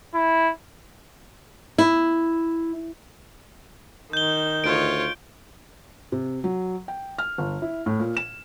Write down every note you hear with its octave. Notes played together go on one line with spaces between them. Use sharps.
E4
E4
D#3 G6 G7
D2 F4 C#5 D7
C3
F#3
G5
F6
G1
E4
A2
A#2
E7